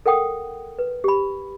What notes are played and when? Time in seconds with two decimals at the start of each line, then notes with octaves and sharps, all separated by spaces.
0.06 A4 A#4 F#5 G5 D#6
0.79 B4
1.04 G4 B5